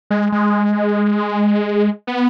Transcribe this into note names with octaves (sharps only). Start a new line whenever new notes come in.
G#3
G#3
B3